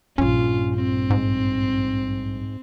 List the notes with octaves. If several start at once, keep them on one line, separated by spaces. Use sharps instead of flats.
A#1 G2 C#4 F4
C4
G#2